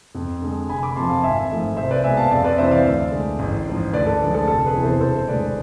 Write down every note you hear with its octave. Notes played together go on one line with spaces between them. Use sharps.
F2
D3 G#3
F1 G#5 B5
B5 D6
F2 C3 F3 A5 C6
F5 A5
G#1 E5 G#5
G#2 F3 A3
C2 C5 E5
B4 D5
B2 G#3 E5 G#5
F5 A5
F2 D5 F5
B4 D5
C3 E3 C5 E5
D5 F5
D2
D3 G#3
A1
G#2 F3
D2 B4 D5
A4
D3 F3 G#3
A4
F1 A4
G#4 B4
E2 C3 E3
A4 C5
E1 A4 C5
D2 D3 G#3 B4 D5